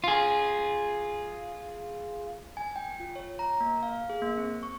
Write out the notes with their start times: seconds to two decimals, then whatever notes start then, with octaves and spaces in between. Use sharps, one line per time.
0.04 F4 G#4
2.57 G#5
2.76 G5
3.00 F4
3.16 C#5
3.39 A#5
3.60 A#3
3.83 F5
4.09 G#4
4.21 A#3
4.38 C4
4.63 C#6